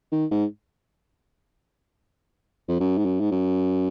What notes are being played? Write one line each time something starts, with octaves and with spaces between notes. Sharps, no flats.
D#3
G#2
F2
F#2
G#2
F#2
G#2
F#2